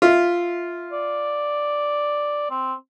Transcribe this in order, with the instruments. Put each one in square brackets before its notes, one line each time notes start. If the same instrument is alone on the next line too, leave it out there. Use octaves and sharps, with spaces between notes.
[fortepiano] F4 E5
[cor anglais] D5
C4